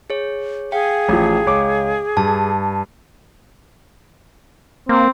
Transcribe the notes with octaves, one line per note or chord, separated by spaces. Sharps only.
G#4 C#5
G#4 F5 G5
A1 F3
C#2 C#5 D6
G2 A5
A#3 C4